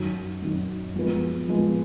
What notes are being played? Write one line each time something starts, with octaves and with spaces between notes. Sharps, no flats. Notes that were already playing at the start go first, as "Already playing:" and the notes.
Already playing: F#2 D#3 F#3
F#2 D#3 F#3
F3 G#3 B3
F3 G#3 B3